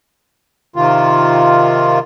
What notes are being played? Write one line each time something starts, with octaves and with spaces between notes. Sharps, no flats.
C3 D#3 F4